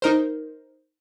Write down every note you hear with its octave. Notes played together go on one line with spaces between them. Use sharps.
D#4 A#4 C5